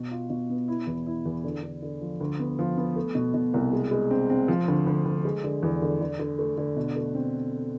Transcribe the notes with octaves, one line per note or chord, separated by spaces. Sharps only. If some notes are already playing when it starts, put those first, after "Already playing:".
Already playing: B2
F4
B2
B3
E4
E2
E4
E2
D3
D3
D3
F3
D2
B3
F3
B3
A3
B2
B2
C2
G#3
G#3
C4
C4
F3
D2
D2
D2
G#3
D3
E2
D3
D3
D3
A3
D3
B2
A3
C4